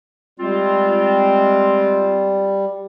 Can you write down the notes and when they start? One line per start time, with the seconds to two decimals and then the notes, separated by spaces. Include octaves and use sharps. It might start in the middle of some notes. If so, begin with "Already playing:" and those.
0.40 G3 G#3 C4 F4